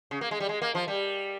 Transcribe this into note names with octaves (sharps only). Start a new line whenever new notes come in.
C#3
A#3
G#3
G3
G#3
A#3
F3
G3